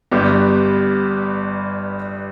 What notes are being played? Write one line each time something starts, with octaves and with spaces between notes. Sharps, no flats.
G1 G2 G3 B3 G4